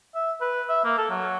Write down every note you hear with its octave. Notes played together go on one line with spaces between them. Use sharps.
E5
B4
E5
A#3
A4
F#3